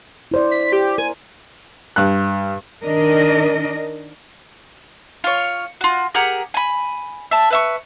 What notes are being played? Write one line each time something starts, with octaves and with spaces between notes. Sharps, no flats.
E4 C5 D5
B6
G4
A#4 G#5
G2 F#6
D#3 D4 A#4 D#5
F4 C#5
F4 F#4
G4 G#4 A#4 F#5
G#5 B5
E5 A5
B4 E5 C#6